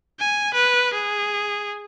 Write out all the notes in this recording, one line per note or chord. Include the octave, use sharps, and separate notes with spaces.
G#5
B4
G#4